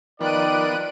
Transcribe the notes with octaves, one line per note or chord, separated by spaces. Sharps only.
D#3 F3 B3 D5 F#6 D7 D#7